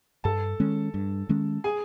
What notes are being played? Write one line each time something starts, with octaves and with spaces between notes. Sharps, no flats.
G2 A4 A5
D#3 G#3 C#4
G2
D#3 G#3 C#4
G#4 G#5